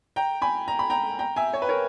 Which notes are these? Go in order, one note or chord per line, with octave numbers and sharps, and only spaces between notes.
G5 A#5
G#5 B5
A#5
B5
G5 A#5
G5 A#5
E5 G#5
C#5
B4
A#4 C#5